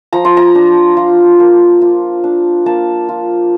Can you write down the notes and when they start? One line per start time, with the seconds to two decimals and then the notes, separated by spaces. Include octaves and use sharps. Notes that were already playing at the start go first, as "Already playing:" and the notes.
0.13 F3 A#5
0.25 C6
0.37 A#5
0.55 D4
0.97 F4
1.40 A#3
1.82 F4
2.24 D4
2.66 A#3 A5
3.09 F4